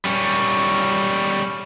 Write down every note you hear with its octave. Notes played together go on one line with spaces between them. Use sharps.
G3 C#4